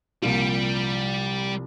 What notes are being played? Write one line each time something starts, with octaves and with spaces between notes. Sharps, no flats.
C2 A#2 F3 G3 A#3 F4